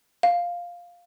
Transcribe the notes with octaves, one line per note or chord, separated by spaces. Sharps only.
F5